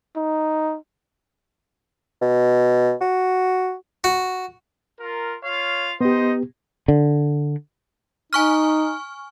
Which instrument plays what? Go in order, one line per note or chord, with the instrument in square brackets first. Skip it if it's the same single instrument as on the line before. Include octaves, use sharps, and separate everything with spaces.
[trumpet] D#4
[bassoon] B2
F#4
[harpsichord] F#4
[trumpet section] F4 A#4
F4 C#5 F5
[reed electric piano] B3 G4 [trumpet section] D#4 C5 D#5
[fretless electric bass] D3
[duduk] D#4 [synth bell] G#5 C#6 F6